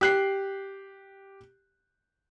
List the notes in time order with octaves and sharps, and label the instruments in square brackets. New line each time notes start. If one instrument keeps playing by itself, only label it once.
[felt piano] G4 F#6 C7